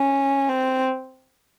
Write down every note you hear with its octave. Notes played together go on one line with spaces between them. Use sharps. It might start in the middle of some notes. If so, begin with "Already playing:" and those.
Already playing: C#4
C4